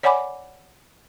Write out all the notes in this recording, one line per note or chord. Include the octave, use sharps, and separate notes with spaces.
C#5 D5 F#5 G#5 B5 D6